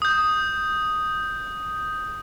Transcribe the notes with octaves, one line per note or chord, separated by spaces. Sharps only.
D#6 G6